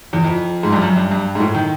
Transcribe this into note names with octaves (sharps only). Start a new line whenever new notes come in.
E2
F2
G#2
G2
F#2
G2
G2
G#2
A2
D#3